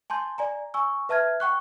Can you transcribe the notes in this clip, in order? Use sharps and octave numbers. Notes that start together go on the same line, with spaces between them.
G#5 A5 C6 G6
D5 G#5 A#5
G#5 C#6 E6
B4 E5 A5 F6 G#6
F#5 G5 C#6 F#6